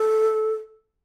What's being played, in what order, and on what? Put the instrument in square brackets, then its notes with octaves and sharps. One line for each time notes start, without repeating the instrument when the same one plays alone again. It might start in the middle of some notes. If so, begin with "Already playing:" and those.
Already playing: [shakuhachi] A4